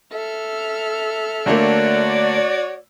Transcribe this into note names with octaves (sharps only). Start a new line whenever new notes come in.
A4 E5 F6
D3 A3 A#3 F#4 C#5 D5